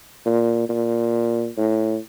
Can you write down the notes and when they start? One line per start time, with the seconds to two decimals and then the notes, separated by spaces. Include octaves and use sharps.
0.26 A#2
0.69 A#2
1.57 A2